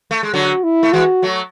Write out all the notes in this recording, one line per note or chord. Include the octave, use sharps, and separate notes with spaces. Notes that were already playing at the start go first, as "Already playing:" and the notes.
A3
G#3
D3 F#3 F#4
E4
A3
E3 G#3 F#4
F#3 A3